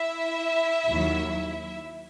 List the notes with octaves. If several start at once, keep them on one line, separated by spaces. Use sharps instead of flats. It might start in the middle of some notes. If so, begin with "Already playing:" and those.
Already playing: E4 E5
D#2 D#3 F#3